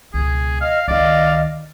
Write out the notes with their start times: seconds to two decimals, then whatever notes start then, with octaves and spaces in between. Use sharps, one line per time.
0.14 E1 C#2 G#4
0.61 D#5 F5 F6
0.88 C#2 D#3 D5 D#5 F5